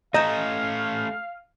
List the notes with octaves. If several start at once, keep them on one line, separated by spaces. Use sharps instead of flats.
A3 C#4 D#5 F5 A#5 G6 E7